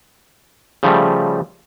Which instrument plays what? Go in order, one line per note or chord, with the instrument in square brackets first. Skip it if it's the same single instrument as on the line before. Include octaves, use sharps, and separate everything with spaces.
[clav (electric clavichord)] C#3 F3 G3 A3